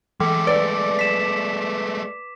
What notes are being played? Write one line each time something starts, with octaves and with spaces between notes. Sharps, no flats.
E3 G#3 A3 D6
B4 D5
B6 E7